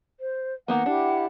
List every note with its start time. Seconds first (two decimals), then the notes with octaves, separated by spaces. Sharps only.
0.20 C5
0.68 D#3 A#3 B3 F#5
0.86 D4 E4 G4